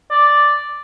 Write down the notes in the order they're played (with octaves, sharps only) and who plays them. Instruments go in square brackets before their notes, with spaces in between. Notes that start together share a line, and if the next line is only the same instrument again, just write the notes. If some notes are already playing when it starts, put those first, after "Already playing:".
[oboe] D5